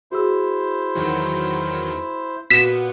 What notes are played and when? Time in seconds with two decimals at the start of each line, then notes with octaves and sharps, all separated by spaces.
0.12 E4 F#4 G#4 C5 E6
0.95 E2 D#3 F#3
2.50 A#2 B3 F#4 B6 E7